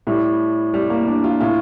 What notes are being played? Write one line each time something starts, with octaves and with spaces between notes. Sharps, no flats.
A2 G3
G3
A#3
D4
F4
A2 F4